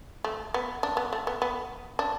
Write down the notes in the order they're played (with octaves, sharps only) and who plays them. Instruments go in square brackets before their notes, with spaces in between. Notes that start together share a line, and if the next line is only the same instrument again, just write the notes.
[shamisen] A3
B3
D4
B3
A3
B3
B3
D4